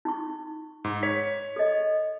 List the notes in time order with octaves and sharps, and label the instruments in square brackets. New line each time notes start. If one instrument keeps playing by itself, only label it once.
[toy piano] D#4 C#6
[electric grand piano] G#2
C#5 B6
[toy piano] A4 D#5